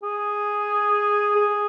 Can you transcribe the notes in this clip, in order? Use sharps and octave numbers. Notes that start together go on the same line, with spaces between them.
G#4
G#4